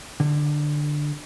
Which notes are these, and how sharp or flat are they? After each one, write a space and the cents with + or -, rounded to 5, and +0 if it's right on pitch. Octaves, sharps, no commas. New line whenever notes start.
D3 +10